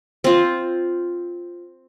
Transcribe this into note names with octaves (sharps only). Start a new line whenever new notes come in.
C4 F4